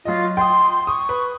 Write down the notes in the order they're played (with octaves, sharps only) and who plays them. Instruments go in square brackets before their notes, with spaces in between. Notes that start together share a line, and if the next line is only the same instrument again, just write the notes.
[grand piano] F#3 D#5 [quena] F4
[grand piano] G5 D#6 [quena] C6
[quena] C#6 [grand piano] D#6
[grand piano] B4